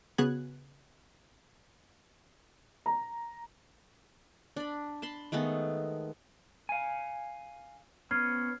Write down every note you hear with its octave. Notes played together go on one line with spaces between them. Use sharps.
C#3 B3 F#4 G#4 F#6 G#6
A#5
D4 B5
A5 B5 C6
D#3 G#3 A3 B3
F5 G#5
B3 C#4 F6 G#6 C7